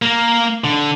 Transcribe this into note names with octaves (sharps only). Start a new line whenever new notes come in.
A#3 A#4
D3